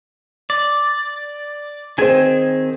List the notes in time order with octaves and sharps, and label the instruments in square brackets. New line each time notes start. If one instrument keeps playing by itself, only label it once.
[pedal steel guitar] D5
[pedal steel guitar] D#3 C4 G#5 [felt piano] G#4 C5